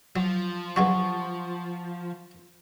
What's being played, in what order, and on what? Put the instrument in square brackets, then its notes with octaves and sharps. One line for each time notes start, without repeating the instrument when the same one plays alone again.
[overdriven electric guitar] F3 [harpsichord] F#3
[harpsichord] G2 C#3 F#3 [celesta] F#5 C#6